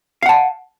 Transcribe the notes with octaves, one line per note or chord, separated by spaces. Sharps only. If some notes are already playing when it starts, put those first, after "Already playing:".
F5 F#5 A5